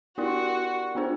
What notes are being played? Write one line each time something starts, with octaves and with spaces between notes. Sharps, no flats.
B3 E4 F#4 G4 A#4 D5
B3 D4 F4 G#4 C5